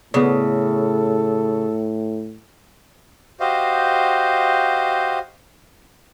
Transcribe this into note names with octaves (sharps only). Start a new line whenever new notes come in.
A2 C#3 B3 A4 D5
F#4 G4 C5 D#5 F5